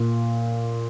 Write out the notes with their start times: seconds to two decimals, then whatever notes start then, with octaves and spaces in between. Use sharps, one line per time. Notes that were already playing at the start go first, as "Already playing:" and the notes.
Already playing: A#2